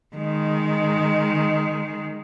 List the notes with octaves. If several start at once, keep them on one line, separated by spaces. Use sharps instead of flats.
D#3 G#3